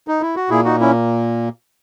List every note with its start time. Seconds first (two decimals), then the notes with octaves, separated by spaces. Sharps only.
0.08 D#4
0.21 E4
0.36 F#4
0.50 A#2 A#3 E4 G#4
0.65 D#4 F#4
0.80 C#4 E4